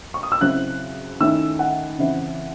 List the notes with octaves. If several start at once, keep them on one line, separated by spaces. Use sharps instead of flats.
C#6
D#6
E6
C#3 F#3 C4 E4 F#6
D#3 A3 C#4 E4 E6
F#5
C#3 E3 C4 E4